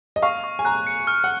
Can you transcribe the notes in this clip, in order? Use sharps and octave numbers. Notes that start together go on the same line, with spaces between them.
D#5
F5 C#6
C#6
G#5
A#5 F#6
C#7
F6
F#5